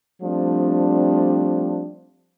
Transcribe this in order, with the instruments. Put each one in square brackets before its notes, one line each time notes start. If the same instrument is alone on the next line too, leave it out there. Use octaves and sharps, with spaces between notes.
[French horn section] F3 G3 A3 C4 D4